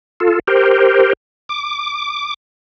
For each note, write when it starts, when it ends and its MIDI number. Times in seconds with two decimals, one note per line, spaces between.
0.20 0.39 65
0.20 0.39 69
0.48 1.13 67
0.48 1.13 70
0.48 1.13 72
1.49 2.34 86